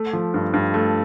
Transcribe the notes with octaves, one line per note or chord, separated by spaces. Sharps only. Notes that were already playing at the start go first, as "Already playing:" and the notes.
Already playing: A3
F3
G2
G2
A3